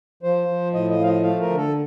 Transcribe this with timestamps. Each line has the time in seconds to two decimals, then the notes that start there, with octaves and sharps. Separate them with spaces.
0.23 F3 C5
0.48 F3
0.73 A2 D#5
0.90 D#5
0.98 F3 F5
1.07 D#5
1.23 A3 F5
1.41 A#4
1.49 D3
1.57 A4